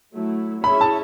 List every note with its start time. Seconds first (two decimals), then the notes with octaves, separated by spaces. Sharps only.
0.14 F#3 A3 E4
0.64 C#4 E4 G#4 C#5 E5 B5
0.81 A5